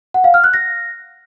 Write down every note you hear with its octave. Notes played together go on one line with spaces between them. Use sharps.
F#5
F5
F6
F#6
A#6